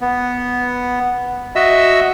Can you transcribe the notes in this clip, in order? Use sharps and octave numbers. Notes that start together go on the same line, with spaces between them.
B3
F#4 D#5 E5 E6